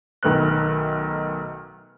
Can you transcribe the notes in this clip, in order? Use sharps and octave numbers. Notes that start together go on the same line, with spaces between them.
B1 D#3 A3 B4 F6 F#6